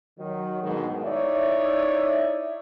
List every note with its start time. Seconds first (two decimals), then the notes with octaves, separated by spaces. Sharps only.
0.18 D#3 F#3
0.62 D2 G#2 B2 D#3 G#3
1.02 D#4 E4 C#5 D5 E5